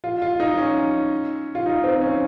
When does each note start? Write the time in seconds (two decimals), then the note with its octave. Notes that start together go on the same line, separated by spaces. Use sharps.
0.04 F4
0.22 F4
0.40 D#4
0.58 C#4
1.55 F4
1.66 D#4
1.84 C4
2.01 C#4